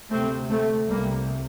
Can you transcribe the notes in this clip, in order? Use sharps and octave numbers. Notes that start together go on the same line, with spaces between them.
D2 C3 A3 C4
A3 C4
C2 C3 G3 A#3